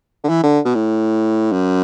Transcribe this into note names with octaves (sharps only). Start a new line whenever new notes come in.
D3
E3
D3
B2
A2
F#2